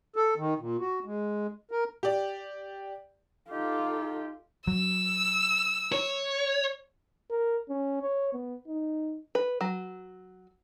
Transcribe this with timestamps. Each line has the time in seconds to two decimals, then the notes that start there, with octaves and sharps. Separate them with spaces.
0.16 A4
0.37 D#3
0.59 A#2
0.79 F#4
1.04 G#3
1.71 A#4
2.03 G4 D5
3.50 D#4 F4 G4 A4
4.67 F#3 E6
5.92 C#5
7.31 A#4
7.69 C#4
8.01 C#5
8.33 B3
8.67 D#4
9.35 B4
9.61 F#3